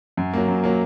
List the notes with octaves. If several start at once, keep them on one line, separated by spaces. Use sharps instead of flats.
F#2
F#3 A#3
F#2
F#3 A#3